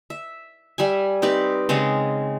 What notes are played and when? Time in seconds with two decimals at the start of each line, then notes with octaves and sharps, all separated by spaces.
0.10 E5
0.78 G3 E5 G#5
1.22 C4 D#4 G4 B4
1.69 C#3 G#3 C4 C#4